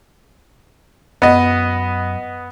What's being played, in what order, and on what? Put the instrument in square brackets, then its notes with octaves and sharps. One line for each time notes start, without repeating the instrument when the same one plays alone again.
[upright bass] F#2 [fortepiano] B3 D#5